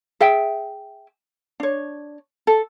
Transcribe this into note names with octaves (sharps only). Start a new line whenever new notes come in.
G#4 E5 G5
D4 C#5
A4